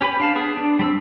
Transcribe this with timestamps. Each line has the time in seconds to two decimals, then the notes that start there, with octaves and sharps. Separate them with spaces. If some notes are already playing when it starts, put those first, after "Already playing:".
0.01 C#4 G4 B4 B5
0.20 D4 F5 A5
0.36 B3 G#4
0.57 D4
0.79 G3 C4 E6